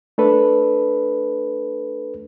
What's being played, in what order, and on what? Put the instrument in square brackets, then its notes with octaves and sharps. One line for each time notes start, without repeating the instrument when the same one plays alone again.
[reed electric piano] A3 D4 A4 B4